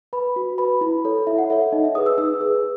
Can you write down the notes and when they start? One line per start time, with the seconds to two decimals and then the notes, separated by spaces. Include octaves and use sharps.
0.13 B4 B5
0.36 F#4
0.58 B4 B5
0.81 E4 B5
1.05 A4 C#5
1.27 E4 E5
1.38 F#5
1.50 A4 C#5 E5
1.72 D#4 D#5
1.84 E5
1.95 G#4 B4 D#6
2.06 E6
2.18 D#4 E6
2.41 G#4 B4